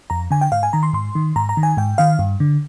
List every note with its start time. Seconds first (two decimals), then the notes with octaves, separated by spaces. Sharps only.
0.10 F2 A#5
0.31 D3 G#5
0.41 G5
0.52 G#2 F5
0.63 G#5
0.73 D#3 A#5
0.83 C6
0.93 G#2 C6
1.15 D#3
1.36 G#2 A#5
1.49 A#5
1.57 D#3
1.63 G#5
1.77 G#2 G5
1.98 D#3 F5
2.19 G2
2.40 D3